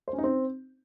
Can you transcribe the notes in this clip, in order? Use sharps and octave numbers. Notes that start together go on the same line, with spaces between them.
C5
C#4
D#4
C4